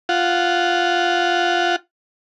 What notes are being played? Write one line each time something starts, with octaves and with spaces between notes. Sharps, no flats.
F4 F#5